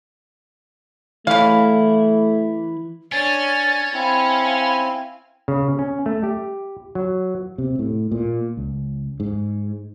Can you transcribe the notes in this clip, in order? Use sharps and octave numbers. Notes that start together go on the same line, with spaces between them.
C#3 E3 A3 E4 F5
C#4 D4 C#5 G#5 A6
C4 E4 F5 G#5 B5
C#3
C#4
A3
G4
F#3
C3
A2
A#2
C#2
G#2